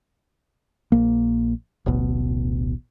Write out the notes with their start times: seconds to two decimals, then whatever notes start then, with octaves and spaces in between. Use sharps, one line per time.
0.92 A#1 A#3
1.86 D1 A1 B2